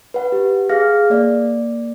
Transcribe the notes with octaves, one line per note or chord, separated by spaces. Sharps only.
B4 F#5
G4
G#4 F5 F6 A#6
A#3 D5